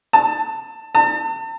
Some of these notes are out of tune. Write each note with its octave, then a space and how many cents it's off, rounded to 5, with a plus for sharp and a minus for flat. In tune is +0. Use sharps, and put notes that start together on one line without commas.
A5 +15
A5 +40